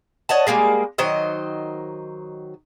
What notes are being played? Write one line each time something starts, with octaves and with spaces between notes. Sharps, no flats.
C#5 D#5 F#5 A5
G3 G#3 A#3 G#4
D#3 F#3 C5 D#5